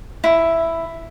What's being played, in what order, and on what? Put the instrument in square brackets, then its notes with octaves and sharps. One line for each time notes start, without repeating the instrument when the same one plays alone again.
[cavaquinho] E4